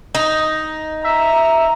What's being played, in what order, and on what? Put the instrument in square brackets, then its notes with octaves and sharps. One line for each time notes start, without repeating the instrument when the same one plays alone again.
[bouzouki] D#4
[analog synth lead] E5 [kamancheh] A#5